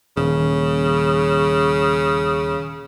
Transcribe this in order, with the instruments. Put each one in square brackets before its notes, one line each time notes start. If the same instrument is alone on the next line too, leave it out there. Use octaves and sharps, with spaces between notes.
[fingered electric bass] D#1 [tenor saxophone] C#3